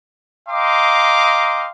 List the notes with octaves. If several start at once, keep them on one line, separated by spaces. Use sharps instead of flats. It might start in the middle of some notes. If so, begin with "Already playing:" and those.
D#5 F5 G5 A#5 C6 D6